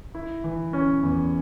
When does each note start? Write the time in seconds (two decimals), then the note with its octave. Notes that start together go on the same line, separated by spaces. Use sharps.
0.15 E4
0.44 E3
0.73 C#4
1.03 E2